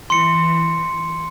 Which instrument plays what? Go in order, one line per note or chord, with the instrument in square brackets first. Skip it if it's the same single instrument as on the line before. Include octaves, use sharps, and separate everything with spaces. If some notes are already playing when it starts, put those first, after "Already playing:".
[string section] E3 [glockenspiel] C6 C#7